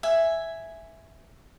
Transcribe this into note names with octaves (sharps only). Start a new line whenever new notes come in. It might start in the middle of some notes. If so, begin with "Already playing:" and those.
E5 G#5